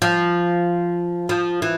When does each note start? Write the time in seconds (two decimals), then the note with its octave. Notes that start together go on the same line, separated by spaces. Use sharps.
0.02 F3
1.29 F3
1.62 E3